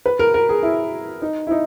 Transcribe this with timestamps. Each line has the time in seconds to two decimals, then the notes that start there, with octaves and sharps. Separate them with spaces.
0.06 B4
0.19 A#4
0.34 A#4
0.49 G#4
0.63 E4
1.22 D#4
1.47 E4
1.51 D#4